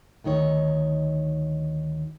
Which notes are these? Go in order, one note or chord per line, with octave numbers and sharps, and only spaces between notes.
D2 D#3 D#4 C#5